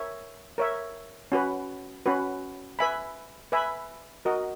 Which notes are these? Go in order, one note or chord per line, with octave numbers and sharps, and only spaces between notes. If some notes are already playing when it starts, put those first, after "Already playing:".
Already playing: A#4 C#5 E5
A#4 C#5 E5
C#4 F#4 B4
C#4 F#4 B4
B4 E5 G#5 B5
B4 E5 G#5 B5
F#4 A#4 D#5